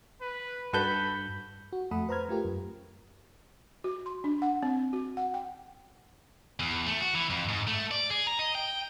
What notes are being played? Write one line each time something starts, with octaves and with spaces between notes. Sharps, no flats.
B4
G2 F#4 A4 B4 B5 G6
F#4
F2 A3 A4 F#5 B5 D#6
B4 C5 A#5 B5 F6 G#6
A3 F4 G4 A#4
F#2
F#4
C6
D4
F#5
C4
F#4
F#5
G5
E2
A3
F#4
E3
F2
G#2
A3
D5
G#4
A#5
D#5
G5